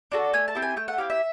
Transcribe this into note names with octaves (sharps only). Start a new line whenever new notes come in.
D4 F#4 A4
A3 G#5
A5
C4 E4 G4
G#5
A3 G5
F#5
C4 E4 G4 F5
E5